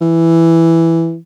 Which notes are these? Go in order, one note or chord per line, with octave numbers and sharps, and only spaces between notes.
E3